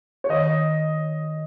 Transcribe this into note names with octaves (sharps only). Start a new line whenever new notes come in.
C#5
D#3 D#5